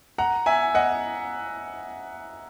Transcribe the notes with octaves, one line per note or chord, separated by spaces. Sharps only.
F#5 A#5
E5 G#5
D#5 F#5